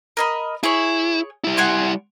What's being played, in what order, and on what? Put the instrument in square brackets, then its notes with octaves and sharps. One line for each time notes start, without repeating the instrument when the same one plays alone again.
[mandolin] A#4 D#5 B5
[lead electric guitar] E4 [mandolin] G#4 C#5
[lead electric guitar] G3 E4
[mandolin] F#5 G#5 C6